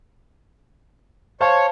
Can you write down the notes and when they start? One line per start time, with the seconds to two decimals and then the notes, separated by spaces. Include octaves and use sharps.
1.41 C5 C#5 F5 A5